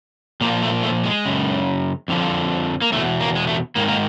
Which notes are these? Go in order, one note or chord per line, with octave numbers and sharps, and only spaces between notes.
A#2 F3 A#3
A3
A3
G#3
F#2 C#3
F2 D3 F3
A#3
E2 B2 A3
A#3
G#3
A3
G#2 D#3 A#3
A#3